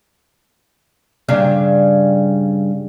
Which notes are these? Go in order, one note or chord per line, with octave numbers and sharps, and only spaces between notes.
G2 C#3 D4